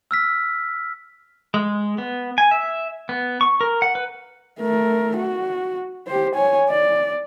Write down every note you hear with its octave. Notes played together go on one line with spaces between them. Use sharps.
E6 F6 B6
G#3
B3
G#5
E5
B3
C#6
A#4
F#5
B4
A3 A#4
F#4
G4 C5
C#5 G#5
D5